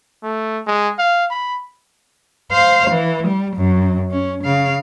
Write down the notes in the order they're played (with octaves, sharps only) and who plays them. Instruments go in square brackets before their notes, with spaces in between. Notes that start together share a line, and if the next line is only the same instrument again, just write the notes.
[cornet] A3
G#3
F5
B5
[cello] C5 F5
E3
G3
F#2
C#4
C#3 F5